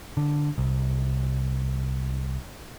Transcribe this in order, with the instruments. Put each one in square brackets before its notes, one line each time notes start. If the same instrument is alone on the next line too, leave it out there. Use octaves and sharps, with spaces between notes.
[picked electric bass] D3
C2